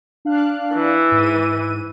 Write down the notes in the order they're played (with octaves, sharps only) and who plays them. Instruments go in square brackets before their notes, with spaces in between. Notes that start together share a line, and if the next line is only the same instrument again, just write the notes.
[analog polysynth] D4 F5 F#6
[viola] E3
[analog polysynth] G#2 D#7